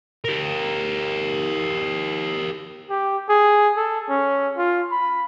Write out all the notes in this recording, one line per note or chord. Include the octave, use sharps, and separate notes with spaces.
G4 A#4
G4
G#4
A4
C#4
F4
B5